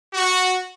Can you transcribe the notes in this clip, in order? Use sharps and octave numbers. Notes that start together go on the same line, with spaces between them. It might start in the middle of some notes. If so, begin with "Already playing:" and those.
F#4